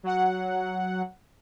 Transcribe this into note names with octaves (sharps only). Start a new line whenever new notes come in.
F#3 F#5